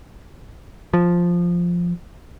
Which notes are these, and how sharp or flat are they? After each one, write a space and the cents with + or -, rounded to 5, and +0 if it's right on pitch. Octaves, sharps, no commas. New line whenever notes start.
F3 +0